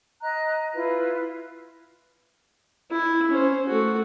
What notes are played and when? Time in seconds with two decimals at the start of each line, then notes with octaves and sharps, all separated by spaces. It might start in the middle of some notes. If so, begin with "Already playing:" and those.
0.21 D#5 A#5 F#6
0.73 E4 F4 B4
2.90 E4
3.31 C#4 C5
3.67 A3 F#4